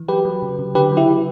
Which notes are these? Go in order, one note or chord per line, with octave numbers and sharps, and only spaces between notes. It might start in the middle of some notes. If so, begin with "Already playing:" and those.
Already playing: E3
F#3 G4 B4
F#3
C#3
C#3
D3 G4 B4
F#3
E4 G4